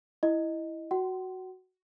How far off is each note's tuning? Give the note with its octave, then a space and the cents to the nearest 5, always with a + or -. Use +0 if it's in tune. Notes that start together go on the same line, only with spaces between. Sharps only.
E4 +0 D#5 +0
F#4 +0 F#5 +40 C6 +0